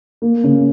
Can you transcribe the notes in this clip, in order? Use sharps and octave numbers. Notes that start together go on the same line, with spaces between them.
A#3
C#3